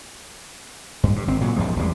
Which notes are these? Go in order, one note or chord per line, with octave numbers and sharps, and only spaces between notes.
G2
G2
G#1 C4
A#2 C#3 F#3
B1 F#2 F3 G#3
F1 E2 G3 G#3